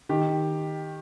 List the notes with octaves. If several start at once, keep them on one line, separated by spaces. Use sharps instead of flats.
D#3 G4